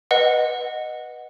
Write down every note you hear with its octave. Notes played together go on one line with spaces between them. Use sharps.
B4 D#5 F#5